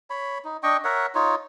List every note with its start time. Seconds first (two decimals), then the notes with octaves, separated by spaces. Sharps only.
0.10 C#5 B5
0.44 D#4
0.63 D4 D#5 G5 C#6
0.84 A#4 C#5 E5 F#5
1.15 D#4 F4 C#5